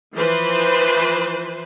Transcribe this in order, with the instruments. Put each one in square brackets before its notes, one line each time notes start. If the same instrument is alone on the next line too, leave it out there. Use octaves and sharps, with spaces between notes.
[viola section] E3 F3 B4 C5